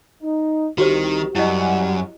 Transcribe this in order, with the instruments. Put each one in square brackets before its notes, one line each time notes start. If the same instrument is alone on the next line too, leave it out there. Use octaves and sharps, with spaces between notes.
[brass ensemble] D#4
[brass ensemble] C2 [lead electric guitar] D#3 [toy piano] F#4 G4 C5
[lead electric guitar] F#2 [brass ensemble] G3 G4 F#5 [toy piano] E4 D#5